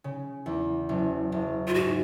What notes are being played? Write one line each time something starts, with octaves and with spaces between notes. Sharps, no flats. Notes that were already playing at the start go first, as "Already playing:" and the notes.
C#3
E2
F#1
F#1
F4
G#2 F#4